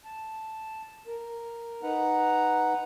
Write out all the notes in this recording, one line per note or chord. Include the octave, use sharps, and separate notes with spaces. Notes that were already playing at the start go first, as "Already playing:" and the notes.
A5
A#4
D#4 B4 F#5 A#5